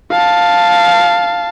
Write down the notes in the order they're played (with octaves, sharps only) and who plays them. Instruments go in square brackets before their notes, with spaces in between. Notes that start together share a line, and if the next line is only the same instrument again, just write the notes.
[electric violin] F5 A5